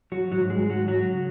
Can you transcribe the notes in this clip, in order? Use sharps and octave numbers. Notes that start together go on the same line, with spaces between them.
F#3 F#4
G#2 D#3 F#3 F#4
G#3 G#4
F#3 F#4
F#3 F#4
C#3